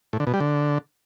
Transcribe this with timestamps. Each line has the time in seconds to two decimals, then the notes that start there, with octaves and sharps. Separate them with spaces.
0.13 A2
0.20 D3
0.27 B2
0.34 G3
0.40 D3